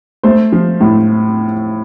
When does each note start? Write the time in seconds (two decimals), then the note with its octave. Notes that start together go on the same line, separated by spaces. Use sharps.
0.23 A3 C5
0.52 F3
0.81 A2